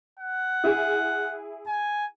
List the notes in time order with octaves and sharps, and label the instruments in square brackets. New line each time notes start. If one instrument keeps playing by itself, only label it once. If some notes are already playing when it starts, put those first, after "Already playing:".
[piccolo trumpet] F#5
[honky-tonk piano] E4 G#4
[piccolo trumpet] G#5